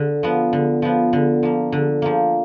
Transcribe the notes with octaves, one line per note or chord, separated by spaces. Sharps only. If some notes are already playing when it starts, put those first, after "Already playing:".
Already playing: D3
F3 B3
D3
F3 B3
D3
F3 A#3
D3
F3 A#3